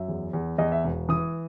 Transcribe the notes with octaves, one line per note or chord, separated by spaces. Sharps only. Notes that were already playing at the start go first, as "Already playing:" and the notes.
Already playing: F#2 E5
E2
E2
E2 D#5
E5
E1
E3 D#6